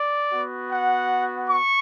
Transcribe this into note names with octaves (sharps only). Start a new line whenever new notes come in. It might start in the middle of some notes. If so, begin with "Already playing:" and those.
Already playing: D5
B3 F#4
F#5
C#6